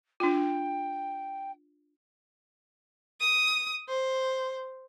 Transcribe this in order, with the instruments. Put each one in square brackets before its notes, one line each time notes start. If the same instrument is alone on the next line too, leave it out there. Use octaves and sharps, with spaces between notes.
[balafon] D4 F4 [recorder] G5
[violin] D#6
C5